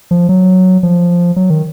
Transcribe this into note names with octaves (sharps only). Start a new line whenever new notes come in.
F3
F#3
F3
F#3
D#3